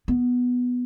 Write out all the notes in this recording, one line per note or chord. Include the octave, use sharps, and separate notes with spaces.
B3